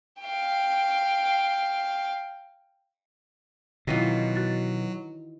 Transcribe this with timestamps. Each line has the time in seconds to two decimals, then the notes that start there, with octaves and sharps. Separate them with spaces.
0.21 F5 G5
3.87 B2 D#3 E3 F#3 F4
4.36 F#4 A6